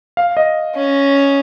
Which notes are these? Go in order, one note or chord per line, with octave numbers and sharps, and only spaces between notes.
F5
D#5
C#4